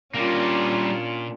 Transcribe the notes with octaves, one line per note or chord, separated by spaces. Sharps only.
A#2 G3 A#3 C#4 D4 F4